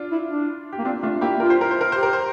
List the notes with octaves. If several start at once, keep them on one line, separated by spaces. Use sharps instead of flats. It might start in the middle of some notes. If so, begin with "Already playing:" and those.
Already playing: D4 F4
E4
D4
G4
A#3
C4 D4 F4
A3 D4 F4
A#3 E4 G4
F4 A#4
C5
A#4
C5
A#4
G4 C5
A#4
C5